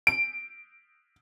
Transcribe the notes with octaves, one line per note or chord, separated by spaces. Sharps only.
D7